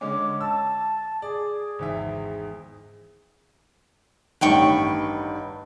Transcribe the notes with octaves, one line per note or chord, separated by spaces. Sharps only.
D3 G#3 C#4 D6
A5 E6
G#4 D5
G#1 E2 E5
A1 G2 D#3 B4 G5 C#6